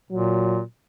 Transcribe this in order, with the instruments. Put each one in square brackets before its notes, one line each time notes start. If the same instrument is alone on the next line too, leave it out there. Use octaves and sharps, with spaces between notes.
[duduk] A#2 [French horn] F#3